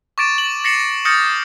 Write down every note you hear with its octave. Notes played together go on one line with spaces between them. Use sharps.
C#6 D6 A6 D7 E7
F#7
A6 A#6 C7 C#7 E7 F#7
D#6 F6 G6 A6 A#6 C#7